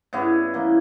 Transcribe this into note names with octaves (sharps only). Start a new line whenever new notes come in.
G2 C#3 B3 E4
E3 A#3